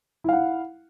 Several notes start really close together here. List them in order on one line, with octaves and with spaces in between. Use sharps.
E4 F5 F#5